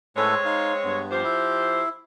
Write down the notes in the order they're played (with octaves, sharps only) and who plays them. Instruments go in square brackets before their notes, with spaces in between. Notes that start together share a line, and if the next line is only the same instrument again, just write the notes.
[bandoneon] A2 A4 B4 [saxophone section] G#3 C4 C#5
[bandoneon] D#4 F5
G2 B3
[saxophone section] F3 G4 C5
[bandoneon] E4